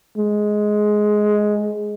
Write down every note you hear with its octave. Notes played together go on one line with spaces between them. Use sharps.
G#3